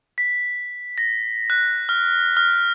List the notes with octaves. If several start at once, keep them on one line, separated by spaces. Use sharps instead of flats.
B6
A#6
F#6
F6
F6